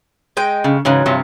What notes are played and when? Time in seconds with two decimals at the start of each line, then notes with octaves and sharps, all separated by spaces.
0.37 G#3 D#5 G5
0.64 C#3
0.85 G#2 C#3 E3 F#3
1.06 G2 C3 F3